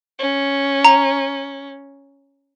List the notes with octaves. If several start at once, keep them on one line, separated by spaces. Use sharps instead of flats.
C#4
A#5